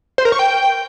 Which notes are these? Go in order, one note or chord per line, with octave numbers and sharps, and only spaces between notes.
C5
A#4
C#6
G5